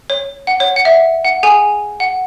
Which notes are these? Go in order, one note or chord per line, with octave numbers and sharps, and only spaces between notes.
C#5
F#5
C#5
F#5
E5
F#5
G#4 G#5
F#5